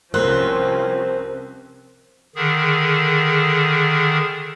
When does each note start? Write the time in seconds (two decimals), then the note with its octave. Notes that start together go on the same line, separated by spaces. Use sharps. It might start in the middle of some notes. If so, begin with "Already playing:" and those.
0.14 C2 F3 C4 C#4 A#4 C6 F#6
2.36 D3 D#3 G#4